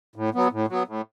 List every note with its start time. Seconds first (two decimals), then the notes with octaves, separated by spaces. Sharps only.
0.16 A2
0.34 F#3 B3
0.52 A2
0.69 F#3 B3
0.87 A2